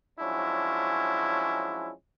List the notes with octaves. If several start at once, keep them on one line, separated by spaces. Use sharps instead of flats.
F3 F#3 G#3 C#4 D4 E4